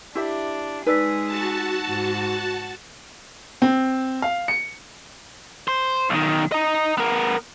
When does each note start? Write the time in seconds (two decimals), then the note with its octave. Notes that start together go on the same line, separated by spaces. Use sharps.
0.15 D4 E4 G4 E5
0.86 G#3 D#4 G#4 B4 D5 E6 B6
1.26 F#4 A5
1.88 G#2
3.62 C4
4.22 F5
4.48 C#7
5.68 C5
6.10 B1 D#3
6.52 D#5 A#5
6.98 B3 A#4